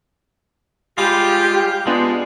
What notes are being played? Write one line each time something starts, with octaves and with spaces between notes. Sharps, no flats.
G3 G#3 F4 G4
G#3 B3 D4 F4